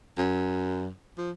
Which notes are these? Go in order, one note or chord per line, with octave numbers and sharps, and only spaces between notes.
F#2
F3